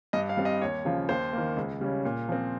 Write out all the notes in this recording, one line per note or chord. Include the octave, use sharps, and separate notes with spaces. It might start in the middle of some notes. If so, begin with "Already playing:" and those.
G2 D#5
F5
G3 C4
D#5
D#2 C#5
C#3 F3
D#2 C5
D#3 A#3
C#2
C#3 G3 C#4
A#2
F3 C4